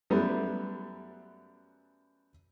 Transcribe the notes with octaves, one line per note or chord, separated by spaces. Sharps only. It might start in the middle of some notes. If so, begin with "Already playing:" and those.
F#2 G3 A3 B3 E4